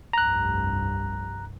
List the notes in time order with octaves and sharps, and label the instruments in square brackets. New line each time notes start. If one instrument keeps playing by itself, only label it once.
[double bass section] F1 C2 G2 [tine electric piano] A#5 F#6